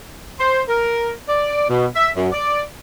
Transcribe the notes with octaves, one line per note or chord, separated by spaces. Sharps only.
C5
A#4
D5
B2
E5
F#2
D5